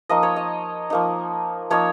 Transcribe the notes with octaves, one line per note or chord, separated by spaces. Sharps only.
F3 A#3 D#4 D#5
C#5
D#5
F3 A#3 D#4
F3 A#3 D#4 C#5